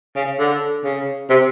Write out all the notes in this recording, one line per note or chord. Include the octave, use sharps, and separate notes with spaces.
C#3
D3
C#3
C3